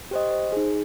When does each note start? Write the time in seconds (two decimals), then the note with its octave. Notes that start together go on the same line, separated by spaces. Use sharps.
0.11 G4 C5 D#5
0.31 C5
0.52 D#4 G#4